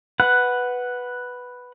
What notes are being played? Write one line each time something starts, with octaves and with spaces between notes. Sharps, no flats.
B4 F#5